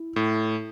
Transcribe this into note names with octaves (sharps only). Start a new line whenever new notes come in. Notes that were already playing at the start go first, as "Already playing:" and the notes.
Already playing: E4
A2